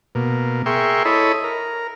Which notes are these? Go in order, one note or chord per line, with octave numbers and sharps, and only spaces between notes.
B2 A#3
G#4 A#4 E5 G5 C6 C#6
E4 A4 C#5 D#5 B5
A#4